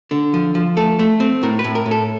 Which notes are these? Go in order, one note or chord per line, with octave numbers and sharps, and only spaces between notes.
D3
F3
F3
A3 A4
A3
C4
A2 A#4
B4
A2
A#4
A2
A4